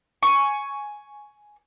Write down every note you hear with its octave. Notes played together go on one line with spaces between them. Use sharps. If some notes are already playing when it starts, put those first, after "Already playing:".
G#5 C#6